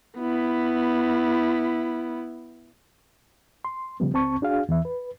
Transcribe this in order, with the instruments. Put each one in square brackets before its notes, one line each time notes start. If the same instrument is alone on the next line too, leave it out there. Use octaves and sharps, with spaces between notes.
[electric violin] B3 E4
[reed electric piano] C6
C#3 F3 G3 B3
C#2 C4 A5 C#6
D4 F#4 G#4 F5
E2 E3 E5
B4